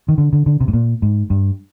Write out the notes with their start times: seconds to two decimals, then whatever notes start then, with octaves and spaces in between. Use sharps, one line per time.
0.09 D#3
0.18 D3
0.33 D3
0.46 D3
0.60 C3
0.68 G#2
0.73 A#2
1.02 G#2
1.30 G2